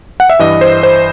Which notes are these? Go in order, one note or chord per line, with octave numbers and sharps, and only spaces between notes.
F#5
E5
G2 E3 D#5
C5
C5